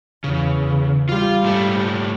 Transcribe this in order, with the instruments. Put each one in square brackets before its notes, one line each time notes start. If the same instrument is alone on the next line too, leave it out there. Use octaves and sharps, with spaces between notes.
[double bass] E2 [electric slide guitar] C#3
[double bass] G3 [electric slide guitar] F4 F5
[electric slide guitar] G#2 A3